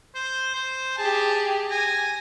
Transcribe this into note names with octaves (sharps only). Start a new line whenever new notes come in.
C5
C5
G4 G#4 A5
G#5 A#6